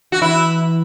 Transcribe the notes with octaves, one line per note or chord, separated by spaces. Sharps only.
F#4
E3 E4